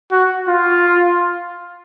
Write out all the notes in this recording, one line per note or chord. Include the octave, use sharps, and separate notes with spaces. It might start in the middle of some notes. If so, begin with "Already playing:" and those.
F#4
F4